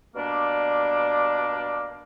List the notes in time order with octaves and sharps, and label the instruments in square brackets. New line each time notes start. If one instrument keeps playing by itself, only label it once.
[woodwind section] B2 G3 A#3 D4